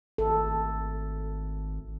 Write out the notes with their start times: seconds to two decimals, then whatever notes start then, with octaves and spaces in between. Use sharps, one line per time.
0.18 G#1 A4